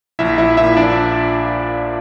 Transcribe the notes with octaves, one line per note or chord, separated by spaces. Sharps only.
A#1 E4 E5
A#1 E4 E5
A#2 E4 E5
F3 D4 D5